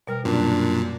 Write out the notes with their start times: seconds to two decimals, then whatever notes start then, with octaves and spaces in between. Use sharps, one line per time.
0.07 B2 G3 A#4 F6
0.25 F#2 A#2 D4